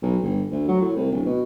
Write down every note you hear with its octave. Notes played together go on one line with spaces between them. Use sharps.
B1
G1
D2
F#3
A2
C2
D1
B2